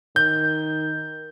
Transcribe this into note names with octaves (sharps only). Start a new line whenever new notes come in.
D#3 G6